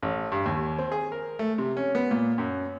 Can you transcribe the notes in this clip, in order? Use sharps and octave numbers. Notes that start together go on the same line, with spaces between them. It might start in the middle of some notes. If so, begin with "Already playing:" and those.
A1
G2
D#2
C4
G#4
A#4
A3
C3
C#4
B3
A#2
F#2